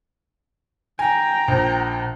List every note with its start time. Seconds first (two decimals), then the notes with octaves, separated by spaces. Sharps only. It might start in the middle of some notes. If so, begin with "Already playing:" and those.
0.99 G5 G#5 A#5
1.48 A#1